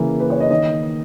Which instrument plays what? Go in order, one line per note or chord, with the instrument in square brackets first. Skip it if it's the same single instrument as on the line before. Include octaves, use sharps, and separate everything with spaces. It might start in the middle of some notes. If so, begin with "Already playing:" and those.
Already playing: [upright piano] C#3 E3 A#3
B4
C#5
D#5
D#3 A#3 D#5